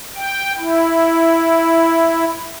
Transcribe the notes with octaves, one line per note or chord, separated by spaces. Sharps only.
G5
E4